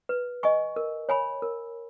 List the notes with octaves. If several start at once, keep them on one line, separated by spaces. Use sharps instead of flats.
B4
D#5 G#5 C#6
A#4
C#5 G#5 B5
A#4